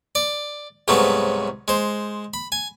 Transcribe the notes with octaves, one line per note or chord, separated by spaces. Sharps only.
D5
C2 G#2 C#3 F#3 A3 B3
G#3 C5
B5
G#5